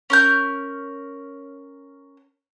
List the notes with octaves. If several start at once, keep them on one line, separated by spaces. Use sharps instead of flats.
C#4 A#4 G6